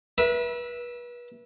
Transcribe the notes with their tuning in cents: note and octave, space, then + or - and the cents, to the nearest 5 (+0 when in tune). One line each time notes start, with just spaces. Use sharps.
B4 -35 E5 +0